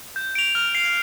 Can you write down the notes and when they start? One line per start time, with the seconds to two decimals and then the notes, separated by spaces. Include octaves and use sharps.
0.16 G6
0.35 D7 F7
0.55 F6
0.75 C7 F7